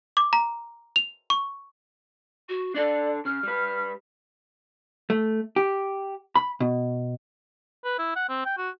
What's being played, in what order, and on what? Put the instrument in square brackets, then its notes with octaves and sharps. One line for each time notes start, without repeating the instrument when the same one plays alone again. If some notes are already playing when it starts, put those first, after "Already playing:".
[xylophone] D6
A#5
F7
C#6
[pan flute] F#4
[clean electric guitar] D4 A4 [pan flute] D5
[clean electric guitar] C#3 [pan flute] F6
[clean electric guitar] G3 B4
[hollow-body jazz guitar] A3
G4
B5
B2
[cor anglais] B4
E4
F#5
C4
G5
F#4